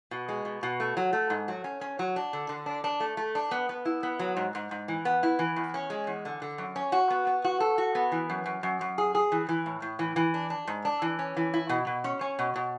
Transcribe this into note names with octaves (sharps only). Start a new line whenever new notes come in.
B2
G#3
B2
B2
A3
F#3
A3
G#2
F#3
C#4
C#4
F#3
D4
D3
D3
D4
D4
A3
A3
D4
B3
B3
E4
B3
F#3
G#2
G#2
G#2
E3
B3
E4
E3
E2
C#4
G#3
E2
D3
D3
F#2
C#4
F#4
B3
B3
F#4
A4
F#4
B3
E3
F#2
F#2
F#2
F#2
G#4
G#4
E3
E3
A2
A2
E3
E3
D4
D4
G#2
D4
E3
C#4
E3
E4
B2
B2
C#4
C#4
B2
B2